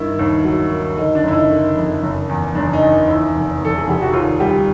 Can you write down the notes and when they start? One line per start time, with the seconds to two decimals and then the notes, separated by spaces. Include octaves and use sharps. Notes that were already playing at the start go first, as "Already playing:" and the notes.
Already playing: G2 D#3 E4
0.19 D#2
0.45 F#3
0.71 D#3
0.98 D3 D#4
1.15 D4
1.23 F#1 E4
1.33 D#4
1.50 D3
1.76 F2
2.03 F#1
2.29 E2
2.55 F#1 D4
2.73 D#4
2.81 E2
3.08 D#2 E4
3.34 F1
3.61 F1 A4
3.78 G#4
3.87 F1 G4
4.02 F#4
4.13 D#2 F4
4.40 G3 G4